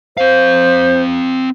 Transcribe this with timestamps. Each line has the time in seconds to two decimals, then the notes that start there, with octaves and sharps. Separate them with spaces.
0.17 C4 C5 F5